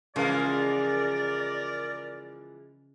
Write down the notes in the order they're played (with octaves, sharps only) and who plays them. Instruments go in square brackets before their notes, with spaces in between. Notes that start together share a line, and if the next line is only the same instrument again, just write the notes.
[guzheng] C#3 [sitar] E3 F3 G#3 [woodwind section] A#4 D5